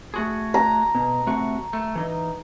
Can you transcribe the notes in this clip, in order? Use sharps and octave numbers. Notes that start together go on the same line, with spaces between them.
A3 F#4 G#4
A#5
B2
C3 A3 F#4
A3
E3 D#4